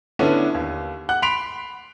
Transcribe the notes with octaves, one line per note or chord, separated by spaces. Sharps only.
D3 B3 C#4 D4 E4
D#2
F#5 F#6
B5 C6 B6 D7 F7